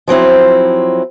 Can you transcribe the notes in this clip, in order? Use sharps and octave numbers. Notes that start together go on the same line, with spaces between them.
F3 F#3 C4 E4